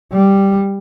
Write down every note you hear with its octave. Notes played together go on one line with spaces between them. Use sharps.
G3